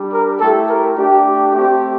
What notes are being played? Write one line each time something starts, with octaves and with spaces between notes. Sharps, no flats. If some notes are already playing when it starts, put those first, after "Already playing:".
Already playing: G3 D4 G4
A#4
A3 E4 G4 A4
A#4
A3 D4 G4
A3 C4 G4